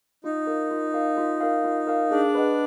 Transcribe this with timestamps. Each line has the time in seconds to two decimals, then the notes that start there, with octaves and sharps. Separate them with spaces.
0.24 D#4 F4
0.47 A#4 F5
0.71 F4
0.94 A#4 F5
1.17 F4
1.40 A#4 F5
1.64 F4
1.87 A#4 F5
2.11 D4 G#4
2.35 B4 D#5 F#5